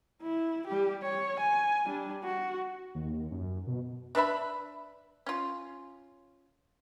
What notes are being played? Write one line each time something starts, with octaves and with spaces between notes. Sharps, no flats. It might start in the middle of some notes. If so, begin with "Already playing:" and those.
E4
G3 G4
C#5
G#5
G3 D4
F#4
D#2
F#2
B2
D4 B4 E5 B5
C#4 F4